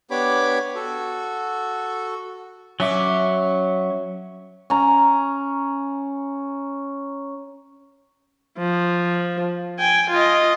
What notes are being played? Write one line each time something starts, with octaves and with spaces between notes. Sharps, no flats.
B3 D4 G4 C#5 B5 D6
F#4 A4
F#3 C#4 E5 D6
C#4 A#5
F3
G5 G#5
F4 D#5